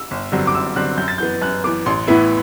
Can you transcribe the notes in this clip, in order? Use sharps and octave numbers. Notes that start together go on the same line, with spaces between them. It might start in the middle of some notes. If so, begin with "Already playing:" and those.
Already playing: E6
G1
G2 D3 F#3 C4
D6
G1 E6
G2 D3 F#3 C4 F#6
F#2 G6
A6
E3 B3 G6
F#2 F#6
E3 B3 D6
A1 C6
A2 E3 B3 E4